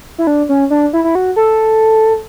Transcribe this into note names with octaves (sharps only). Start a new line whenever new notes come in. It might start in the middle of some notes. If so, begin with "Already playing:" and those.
E4
D4
C#4
D4
E4
E4
F#4
A4